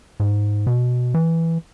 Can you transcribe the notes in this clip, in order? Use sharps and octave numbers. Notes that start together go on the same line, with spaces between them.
G#2
B2
E3